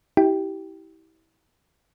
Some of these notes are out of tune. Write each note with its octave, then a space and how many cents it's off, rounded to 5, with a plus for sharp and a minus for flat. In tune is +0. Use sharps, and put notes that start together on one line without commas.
E4 -30 G4 -20 G5 +0